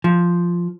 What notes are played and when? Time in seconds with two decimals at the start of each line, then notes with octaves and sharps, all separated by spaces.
0.04 F3